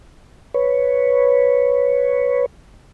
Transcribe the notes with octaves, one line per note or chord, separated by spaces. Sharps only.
B4 C#5